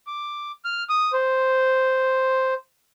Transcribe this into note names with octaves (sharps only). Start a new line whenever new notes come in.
D6
F6
D#6
C5